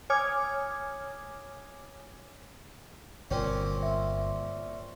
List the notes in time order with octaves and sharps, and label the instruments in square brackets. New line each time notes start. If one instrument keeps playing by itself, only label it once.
[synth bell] C#5 G#5 D6 D#6 F6 G#6
[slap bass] G1 [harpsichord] A#2 C4 C#4
[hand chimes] E5 C6